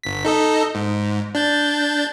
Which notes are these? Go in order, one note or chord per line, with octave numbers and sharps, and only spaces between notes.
G1 B6
D#4 A4 D#5
G#2
D4 G6 A6